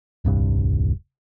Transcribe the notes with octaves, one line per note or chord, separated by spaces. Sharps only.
D#1 C2 G2